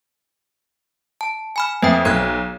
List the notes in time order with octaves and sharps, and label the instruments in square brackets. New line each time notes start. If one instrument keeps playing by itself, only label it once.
[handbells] A5
G#5 B5 F6
[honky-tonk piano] F2 [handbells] B4 E5 G5
[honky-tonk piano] B1 [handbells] F#6 G#6